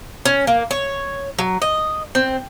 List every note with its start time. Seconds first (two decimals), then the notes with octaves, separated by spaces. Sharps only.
0.25 C#4
0.47 A#3
0.71 C#5
1.39 F#3
1.62 D#5
2.15 C4